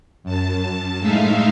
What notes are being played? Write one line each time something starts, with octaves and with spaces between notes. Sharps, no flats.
F#2 A5
A2 G#3 D#4 E5 F5